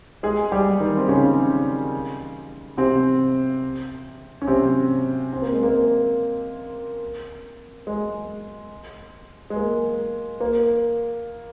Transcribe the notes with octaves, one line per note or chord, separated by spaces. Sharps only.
G#3 G#4
G3 G4
D#3 D#4
C4
C#3 C#4
C3 C4
C#4
C3 C4
C4
A#3
G#3
A#3
G#3
G#3
A#3
A#3